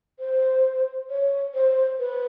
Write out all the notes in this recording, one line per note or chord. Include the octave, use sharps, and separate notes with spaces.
C5
C#5
C5
B4